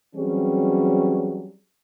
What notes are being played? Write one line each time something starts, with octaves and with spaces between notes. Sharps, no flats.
E3 F#3 G3 C4 C#4 G#4